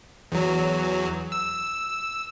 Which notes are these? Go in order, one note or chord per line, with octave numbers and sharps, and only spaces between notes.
E2 F#3
E6